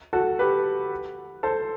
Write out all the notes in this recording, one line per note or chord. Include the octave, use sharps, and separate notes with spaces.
F#4 A4
G4 B4
A4 C5